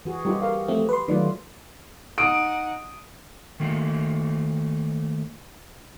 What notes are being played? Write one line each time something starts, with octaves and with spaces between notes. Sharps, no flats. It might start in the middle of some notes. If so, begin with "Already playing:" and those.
E3 F#4 G#4
G3 D#4 F4 G4
A#4 F5
F3 A3 C4
B4 C6
D#3 F#3 A3 F4 B4 D5
D#4 F#5 D#6 D7
D#3 A3 A#3